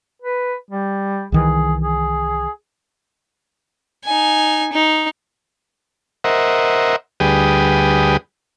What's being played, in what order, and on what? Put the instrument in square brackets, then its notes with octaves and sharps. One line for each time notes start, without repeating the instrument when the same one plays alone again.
[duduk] B4
G3
[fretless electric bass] C2 D#3 E3 [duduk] G#4
[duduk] G#4
[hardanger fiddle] D#4 G#5
D#4
[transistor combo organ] A#4 C5 D#5 E5 F#5
D2 G3 G#4 B4 G5 D#6